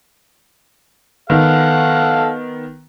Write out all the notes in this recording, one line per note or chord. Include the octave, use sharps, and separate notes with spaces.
D#3 B3 A4 F5 F#5